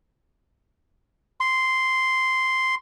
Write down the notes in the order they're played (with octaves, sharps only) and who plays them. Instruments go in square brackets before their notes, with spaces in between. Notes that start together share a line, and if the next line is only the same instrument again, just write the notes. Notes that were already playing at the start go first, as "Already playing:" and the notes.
[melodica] C6